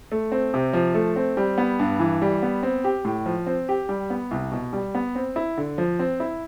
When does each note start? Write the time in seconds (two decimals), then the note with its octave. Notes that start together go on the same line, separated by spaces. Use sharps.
0.12 A3
0.32 C4
0.54 C3
0.73 F3
0.94 A3
1.16 C4
1.37 G3
1.58 B3
1.79 G2
1.99 E3
2.22 G3
2.43 B3
2.63 C4
2.84 G4
3.05 A2
3.26 F3
3.46 C4
3.69 G4
3.89 G3
4.10 B3
4.31 C2
4.51 B2
4.73 G3
4.95 B3
5.15 C4
5.36 E4
5.57 D3
5.78 F3
5.99 C4
6.20 E4